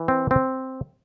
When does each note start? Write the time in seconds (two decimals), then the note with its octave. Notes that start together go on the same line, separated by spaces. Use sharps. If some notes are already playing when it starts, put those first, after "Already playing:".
Already playing: E3
0.08 C4
0.31 C4